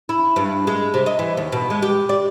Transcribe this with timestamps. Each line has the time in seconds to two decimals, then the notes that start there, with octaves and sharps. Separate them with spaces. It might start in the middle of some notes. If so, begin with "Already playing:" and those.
0.09 E4
0.36 G2
0.67 G#3
0.94 C3
1.06 D#5
1.19 E3
1.37 D#2
1.52 B2
1.70 G#3
1.82 G4
2.09 D5